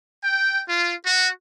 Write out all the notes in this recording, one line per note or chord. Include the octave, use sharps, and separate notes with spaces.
G5
F4
F#4